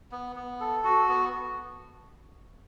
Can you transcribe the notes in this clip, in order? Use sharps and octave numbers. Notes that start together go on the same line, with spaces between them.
B3
B3
A4
F#4
B3